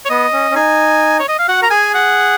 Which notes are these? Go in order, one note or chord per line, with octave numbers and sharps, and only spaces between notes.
C#5
B3 D#5
C#4
C#4
D#4 G#5
C#5
D#5
F5
F#4 F#5
A#4 A#5
G#4 G#5
F#5